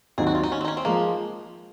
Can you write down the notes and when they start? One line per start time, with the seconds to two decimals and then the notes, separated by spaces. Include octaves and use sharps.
0.18 D#2 D#3 F#3 C4 D#4 G#4
0.27 F#4
0.35 F4
0.43 D#4
0.52 C#4
0.61 C4
0.65 D#4
0.68 C#4
0.77 C4
0.85 F3 G#3 A#3